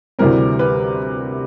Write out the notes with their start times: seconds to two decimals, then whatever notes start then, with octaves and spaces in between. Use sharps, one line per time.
0.19 D2 C3 E3 G3 C4 A#4
0.59 B4